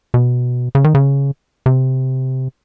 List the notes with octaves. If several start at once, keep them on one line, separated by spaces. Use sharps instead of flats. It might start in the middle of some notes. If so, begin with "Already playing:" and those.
B2
C#3
D#3
C#3
C3